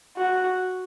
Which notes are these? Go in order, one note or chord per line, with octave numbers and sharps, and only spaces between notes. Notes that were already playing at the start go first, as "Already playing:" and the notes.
F#4